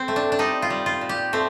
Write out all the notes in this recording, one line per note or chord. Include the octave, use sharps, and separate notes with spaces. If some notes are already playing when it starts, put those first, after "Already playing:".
Already playing: C4
A3
D4
D4
G3 D#4
F4
G3
F4
A#2
G4
A3 C4